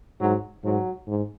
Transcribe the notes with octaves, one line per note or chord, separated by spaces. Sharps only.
G#2 F#3
G#2 F#3
G#2